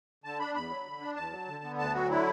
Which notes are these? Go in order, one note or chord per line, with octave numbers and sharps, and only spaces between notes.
D3 A5
D4 B5
E2 B5
F#3
D3
D4
E2 A5
F#3
D3
B3
D2 A5
F#3 F#4
D3 E4